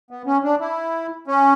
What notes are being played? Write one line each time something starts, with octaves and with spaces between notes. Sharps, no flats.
B3
C#4
D4
E4
C#4